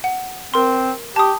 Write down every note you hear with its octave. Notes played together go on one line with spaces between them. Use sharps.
F#5
C4 A#4 C6
G4 A5 D#6